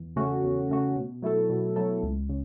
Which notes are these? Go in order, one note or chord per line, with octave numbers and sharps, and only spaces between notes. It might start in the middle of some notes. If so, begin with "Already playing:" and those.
Already playing: E2
C#3 A3 C#4 F#4
E2
C#3 A3 C#4 F#4
B2
F#3 A3 E4 A4
B2
F#3 A3 E4 A4
C#2
C#3